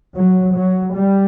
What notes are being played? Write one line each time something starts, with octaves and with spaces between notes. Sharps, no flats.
F#3
F#3
G3